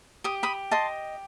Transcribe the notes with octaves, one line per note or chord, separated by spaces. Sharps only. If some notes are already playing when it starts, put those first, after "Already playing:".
G4 D#6
B5 D#6
D#5 A5 C6